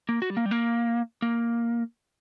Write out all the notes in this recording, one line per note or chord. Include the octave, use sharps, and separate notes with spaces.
A#3
F#4
G3
A#3
G3
A#3
A#3